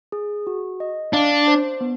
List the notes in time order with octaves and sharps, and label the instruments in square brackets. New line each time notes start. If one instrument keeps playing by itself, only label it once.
[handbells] G#4
F#4
D#5
[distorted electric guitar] D4 [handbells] F5
[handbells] C5
B3